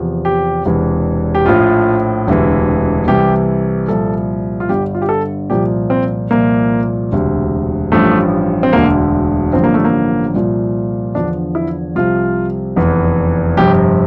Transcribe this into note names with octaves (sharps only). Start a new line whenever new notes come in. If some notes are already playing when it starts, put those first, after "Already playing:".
Already playing: E2 C3 F3
G4
E1 E2 C3 E3
G4
A#1 A2 F3 F4
E1 D2 C3 E3
C2 C3 E3 G4
C2 A#2 F3 A4
F4
G1 G2 D3 G4
F4
G4
A4
C2 A#2 F3 G4
C4
C2 A#2 F3 A#3
E1 D2 C3
A1 G2 F3 A3
C4
E1 D2 D3 A#3
A1 G2 D3 F3 C4
A#3
A3
A#3
C2 A#2 F3
E2 D3 F3 D4
E4
C2 C3 F3 F4
F1 E2 E3
G1 F2 C3 G4